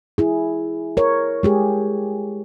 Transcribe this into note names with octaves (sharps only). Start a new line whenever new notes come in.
E4 G#4
A#4 C#5
G#3 G4 G#4